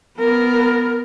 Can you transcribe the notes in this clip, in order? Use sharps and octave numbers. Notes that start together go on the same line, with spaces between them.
B3 A#4